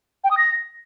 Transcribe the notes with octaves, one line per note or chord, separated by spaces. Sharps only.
G5
D#6
A#6